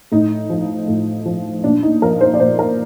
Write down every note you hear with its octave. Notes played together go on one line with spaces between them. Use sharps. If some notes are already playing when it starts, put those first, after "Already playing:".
A2 D#4
F3
A2
F3
A#2 D4
D#4
F3 A#4
C5
D5
A#2 C5
A#4